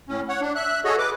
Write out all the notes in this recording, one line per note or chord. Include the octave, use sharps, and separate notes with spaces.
A2 C#4
C#5 F#5
D4
E5 F#6
F#4 G#4 A4 C#5 D#5
B4 D6